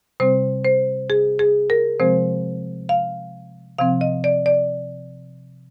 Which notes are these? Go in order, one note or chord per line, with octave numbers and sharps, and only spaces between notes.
C3 G3 C4 C5
C5
G#4
G#4
A#4
C3 F3 G#3 C4 C5
F5
C3 F3 C4 F5
D#5
D5
D5